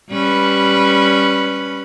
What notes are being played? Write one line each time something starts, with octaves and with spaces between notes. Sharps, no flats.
G3 C#4 B4